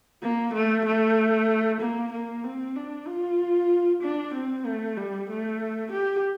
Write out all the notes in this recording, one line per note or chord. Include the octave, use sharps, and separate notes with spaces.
A#3
A3
A3
A#3
A#3
C4
D4
F4
D4
C4
A3
G3
A3
G4